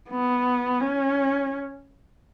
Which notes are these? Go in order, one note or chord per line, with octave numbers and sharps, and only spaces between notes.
B3
C#4